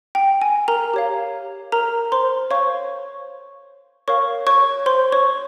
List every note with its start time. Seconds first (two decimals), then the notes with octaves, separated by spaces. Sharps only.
0.15 G5
0.41 G#5
0.68 A#4 A#5
0.94 G4 C#5 F5
1.72 A#4 A#5
2.12 C5 C6
2.51 C5 C#5 F5 C#6
4.08 A#4 C#5 F5 C#6
4.47 C#5 C#6
4.86 C5 C6
5.12 C#5 C#6